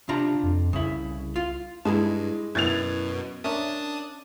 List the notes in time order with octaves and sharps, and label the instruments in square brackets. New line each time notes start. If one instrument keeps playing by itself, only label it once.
[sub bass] C3 [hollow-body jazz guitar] D4 F4 A#5
[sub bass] F2
[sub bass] C2 [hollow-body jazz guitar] C#3 E4
[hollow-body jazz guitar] F4
[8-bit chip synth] G2 [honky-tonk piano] G#3 [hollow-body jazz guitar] E4 G#4 A5
[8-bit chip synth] F#2 B2 [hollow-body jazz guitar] E4 [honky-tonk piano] G#6 A6 F7
[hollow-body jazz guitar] C#4 A#4 E5 [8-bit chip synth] D4 A5 D#6